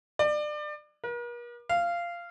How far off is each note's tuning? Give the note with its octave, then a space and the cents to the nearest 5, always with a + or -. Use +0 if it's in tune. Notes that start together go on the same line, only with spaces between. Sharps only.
D5 +30
A#4 +45
F5 -15